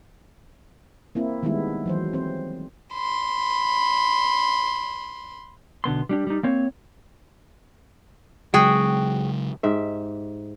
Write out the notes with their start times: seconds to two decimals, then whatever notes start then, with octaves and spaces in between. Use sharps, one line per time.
1.15 A#3 C4 E4
1.43 D#3 G3 G#3 B3 E4
1.86 E3 F#3 C5
2.13 C4 C5
2.94 B5 C6
5.84 B1 D3 B3 C6
6.09 G3 D4 G4
6.27 G3 D#4
6.43 A#3 C4 C#5
8.54 C#3 F#3 G#3 F#4 G#4 G5
9.63 G#2 G4 E5